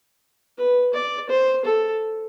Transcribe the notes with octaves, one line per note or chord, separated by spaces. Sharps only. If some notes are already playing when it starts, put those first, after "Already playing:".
B4
D5
C5
A4